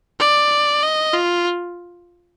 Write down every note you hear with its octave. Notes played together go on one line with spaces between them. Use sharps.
D5
D#5
F4